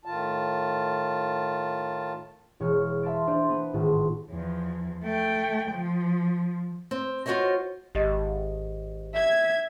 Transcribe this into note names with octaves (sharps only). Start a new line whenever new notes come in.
A2 D#3 F4 A5
E1 C#5 F6
C#5
E5 F5 A5 C6 A6 D7
D4 C5 D5 D#5 A5
B3
G#1 A2 F4 A5
E2 F3
A3 G5
F3
C4
F4 F#4 G#4 C5 C#5 D#5
G#1 G4 D#5
E5 G#6